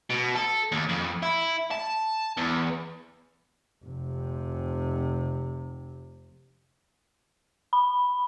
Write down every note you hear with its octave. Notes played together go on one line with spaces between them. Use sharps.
B2
A4
D#2
F2
E4
A5
E2
F1 C3
B5